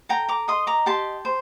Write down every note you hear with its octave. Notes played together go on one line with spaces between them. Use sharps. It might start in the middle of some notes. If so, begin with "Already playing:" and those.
A4 G5 A#5
A#5 D6
D#5 C6 D#6
A#5 D6
G4 A5 C6
C5